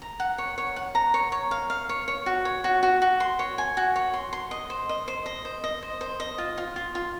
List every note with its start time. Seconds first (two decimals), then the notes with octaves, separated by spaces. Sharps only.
0.02 A#5
0.20 F#5
0.38 C#5
0.58 C#5
0.76 F#5
0.95 A#5
1.14 C#5
1.32 C#5
1.51 F5
1.70 F5
1.89 C#5
2.08 C#5
2.26 F#4
2.45 C#5
2.64 F#4
2.83 F#4
3.02 F#4
3.20 C6
3.39 C#5
3.58 G#5
3.77 F#4
3.96 C#5
4.14 C6
4.33 C6
4.51 D#5
4.70 C5
4.89 D#5
5.08 C5
5.26 D#5
5.45 C5
5.64 D#5
5.83 C5
6.01 C5
6.20 D#5
6.38 F4
6.58 F4
6.76 F4
6.95 F4